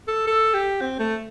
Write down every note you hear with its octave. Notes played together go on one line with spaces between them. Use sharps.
A4
A4
G4
C4
A3